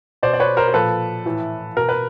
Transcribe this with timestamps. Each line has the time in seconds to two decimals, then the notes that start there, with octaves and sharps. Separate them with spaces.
0.23 B2 C5 D5
0.34 D5
0.40 B4 C#5
0.57 A#4 C5
0.68 A#4
0.74 A#2 F3 A4 B4
1.26 A2 E3
1.77 B2 A#4
1.89 B4